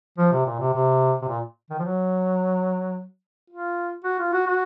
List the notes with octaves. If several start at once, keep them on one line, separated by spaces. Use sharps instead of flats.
F3
C3
A#2
C3
C3
C3
A#2
D#3
F3
F#3
F4
F#4
F4
F#4
F#4